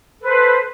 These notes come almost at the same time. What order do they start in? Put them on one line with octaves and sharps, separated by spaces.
A4 B4 C5